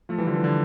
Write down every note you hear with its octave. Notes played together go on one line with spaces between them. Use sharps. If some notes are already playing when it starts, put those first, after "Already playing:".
F3 A3
E3 G3
D3 F3
E3
D3